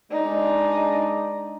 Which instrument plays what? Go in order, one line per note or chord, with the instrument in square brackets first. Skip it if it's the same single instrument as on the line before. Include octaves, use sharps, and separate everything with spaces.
[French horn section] G#3 D4 D5 [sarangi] D#4